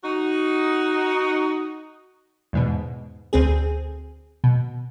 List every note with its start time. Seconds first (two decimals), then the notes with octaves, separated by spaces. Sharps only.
0.03 D#4 F#4
2.53 E2 G#2 B2
3.33 D2 C4 G#4
4.44 B2